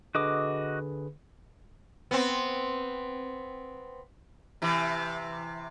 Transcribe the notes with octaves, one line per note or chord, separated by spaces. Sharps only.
D3 F#4 G#4 B4 D#5 D6
B3 C4
C3 E3